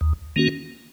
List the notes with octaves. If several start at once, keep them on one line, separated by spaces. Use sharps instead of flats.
D#2
D#3 A#3 C#4 F#4